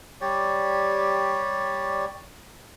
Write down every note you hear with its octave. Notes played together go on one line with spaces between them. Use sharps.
G3 G4 C#5 D5